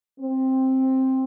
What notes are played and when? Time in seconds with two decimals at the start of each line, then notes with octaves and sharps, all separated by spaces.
0.20 C4